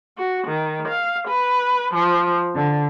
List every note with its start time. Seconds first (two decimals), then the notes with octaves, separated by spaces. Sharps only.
0.18 F#4
0.48 D#3
0.88 F5
1.27 B4
1.95 F3
2.55 D3